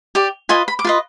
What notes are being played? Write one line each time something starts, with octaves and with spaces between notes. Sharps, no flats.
G4 D5
F4 B4 D#5 G#5
B5
D6
F4 B4 D#5 C6